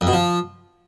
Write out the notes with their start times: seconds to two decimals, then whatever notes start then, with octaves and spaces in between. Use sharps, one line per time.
0.01 F2
0.07 B2
0.13 F3